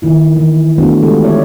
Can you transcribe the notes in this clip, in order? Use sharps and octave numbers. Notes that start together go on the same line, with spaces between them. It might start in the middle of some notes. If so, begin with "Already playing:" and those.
D#3 E4 F4
E3
A3 B3 D4 F4 F#4
D3 E3 G#3 F4 G4 A4
C#4 F4 C#5 D5 E5